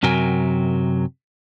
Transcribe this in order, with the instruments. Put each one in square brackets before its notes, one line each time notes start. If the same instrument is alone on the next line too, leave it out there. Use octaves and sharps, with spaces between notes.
[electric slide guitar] F#2 C3 F#3 A#4 G5 G#5